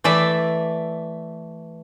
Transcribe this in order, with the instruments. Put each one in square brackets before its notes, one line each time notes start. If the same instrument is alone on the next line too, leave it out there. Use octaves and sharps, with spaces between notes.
[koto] E3 A3 D5 E5